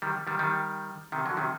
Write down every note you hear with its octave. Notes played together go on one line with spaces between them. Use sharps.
D#3 G3
D#3 G3
D#3 G3
C3 D#3
D3 F#3
C3 D#3